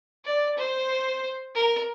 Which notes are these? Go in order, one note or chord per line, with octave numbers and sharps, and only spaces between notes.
D5
C5
A#4